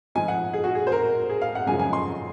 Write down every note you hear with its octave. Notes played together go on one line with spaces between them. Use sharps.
G#2 F3 G#3 G#5
F#5
G#4
F#4
G#4
C5
A#4
G#4
F5
F#5
F#2 C#3 F3 G#3 G#5
G#5
C6